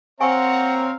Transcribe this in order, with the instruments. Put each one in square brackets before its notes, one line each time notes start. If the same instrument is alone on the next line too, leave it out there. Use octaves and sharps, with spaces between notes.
[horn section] C4 [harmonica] C#5 F5 A#5 [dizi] F#5 [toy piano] G#5 C#6